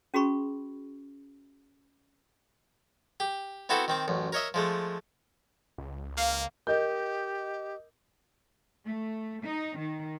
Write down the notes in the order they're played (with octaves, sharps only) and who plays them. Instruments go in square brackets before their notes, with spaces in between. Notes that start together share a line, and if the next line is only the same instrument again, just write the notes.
[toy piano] C#4 F#4 G#4 B5 C#6
[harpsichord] G4
B3 C4 E4 F#4 A4 C5
D#3 C4 D6
A1 F#2
A#4 C#5 D#5 E5
F3 G#3 A3
[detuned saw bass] C#2
[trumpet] A#3 [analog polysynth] F5
[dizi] G4 [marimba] A#4 [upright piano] D#5 G6
[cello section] A3
D#4
D#3